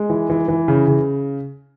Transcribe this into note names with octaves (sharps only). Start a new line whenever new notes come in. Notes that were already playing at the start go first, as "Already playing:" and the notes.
Already playing: G#3
E3
E3
E3
C#3
C#3